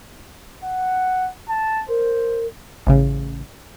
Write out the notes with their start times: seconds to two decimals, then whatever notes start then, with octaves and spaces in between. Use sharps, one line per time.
0.64 F#5
1.49 A5
1.89 A#4 C5
2.87 A1 C#3